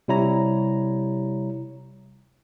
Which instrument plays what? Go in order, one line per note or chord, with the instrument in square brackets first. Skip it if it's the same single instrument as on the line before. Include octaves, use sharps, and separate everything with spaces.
[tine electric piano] C3 G3 E4 C#5 A#5